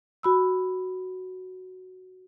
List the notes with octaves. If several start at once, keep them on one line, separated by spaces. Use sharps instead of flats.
F#4 B5 E6